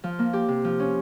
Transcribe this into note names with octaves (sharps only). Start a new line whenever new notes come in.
F3
A#3
G4
C3
F3
C#4